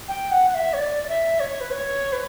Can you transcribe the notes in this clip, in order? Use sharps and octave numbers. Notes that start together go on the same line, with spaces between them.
G5
F#5
F#5
E5
C#5
D5
D5
E5
C#5
B4
C#5
B4